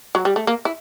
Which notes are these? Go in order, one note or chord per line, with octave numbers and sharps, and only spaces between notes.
F#3
G3
A3
A#3
E4